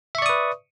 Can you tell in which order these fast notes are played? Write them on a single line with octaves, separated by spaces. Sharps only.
E5 C#6 D5 D#6 B4